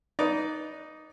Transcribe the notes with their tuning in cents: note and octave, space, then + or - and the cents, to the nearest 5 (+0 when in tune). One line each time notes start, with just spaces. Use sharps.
D#4 +0 B4 +0 D5 -20